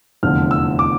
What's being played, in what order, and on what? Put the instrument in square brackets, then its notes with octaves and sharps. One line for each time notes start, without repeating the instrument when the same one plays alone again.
[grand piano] F1 E2 D3 F3 F6
E6
D6